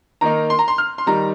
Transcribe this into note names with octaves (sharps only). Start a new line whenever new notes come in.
D#3 A#3 D#4 A#5
C6
A#5
C6
F6
C6
D#3 G3 D#4 A#5